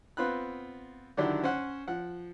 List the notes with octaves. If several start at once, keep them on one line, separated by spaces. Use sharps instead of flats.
B3 C4 F4 B5 F#6
D3 D#3 F#3 D4 E4 G4
C#4 C5 F#5
F3 F#5